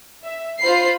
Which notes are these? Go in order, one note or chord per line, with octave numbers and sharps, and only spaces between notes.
E5
F4 C5 B5 C7